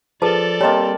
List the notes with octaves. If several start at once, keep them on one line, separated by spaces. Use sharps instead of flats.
F3 G#4 A4 B4 D5 A5
G3 A#3 C4 C#5 D#5 A5